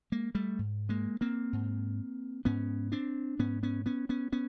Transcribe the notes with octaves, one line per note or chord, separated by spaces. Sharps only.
G#3 A#3
G3 A3
G#2
G#3 A#3
A#3 C4
G#2
G#2 B3 C#4
C4 D4
G#2 B3 C#4
B3 C#4
B3 C#4
B3 C#4
B3 C#4